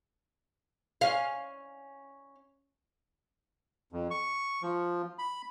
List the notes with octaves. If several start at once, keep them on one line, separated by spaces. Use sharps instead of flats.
C#4 F5
F2
C#6
F3
B5